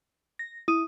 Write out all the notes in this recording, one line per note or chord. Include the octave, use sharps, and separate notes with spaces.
A#6
E4 D#6 D#7